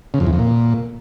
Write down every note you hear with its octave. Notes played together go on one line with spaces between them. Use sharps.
C#3
F2
E2
F2
A#2